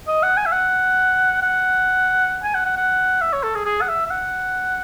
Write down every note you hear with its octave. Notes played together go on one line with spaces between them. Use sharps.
D#5
F#5
G#5
E5
F#5
F#5
G#5
F#5
F#5
F#5
E5
C#5
A4
G#4
G#4
F#5
E5
E5
F#5